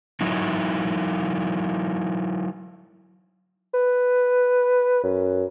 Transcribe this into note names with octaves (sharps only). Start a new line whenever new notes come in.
F#3 D#4 E4
B4
F#2